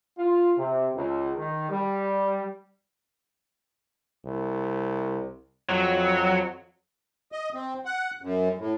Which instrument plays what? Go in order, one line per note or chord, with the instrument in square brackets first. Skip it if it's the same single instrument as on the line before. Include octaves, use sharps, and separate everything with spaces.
[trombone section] F4
C3
C#2
D#3
G3
[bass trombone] C2
[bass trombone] F2 [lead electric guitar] F#3
[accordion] D#5
C4
F#5
F#2
A2